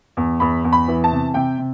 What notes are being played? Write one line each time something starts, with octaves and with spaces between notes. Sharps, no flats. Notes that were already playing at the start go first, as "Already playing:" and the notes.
E2
E2 B5
E2
B5
E3
A5
C3
C3 G5
C3